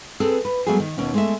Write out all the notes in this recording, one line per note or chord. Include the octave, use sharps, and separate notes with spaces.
C4 G#4 A4 B4
B4
F#3 G3 A3 B3 F#4 G#4
D#3
D#2 B2 C#4
G#3 A3 E5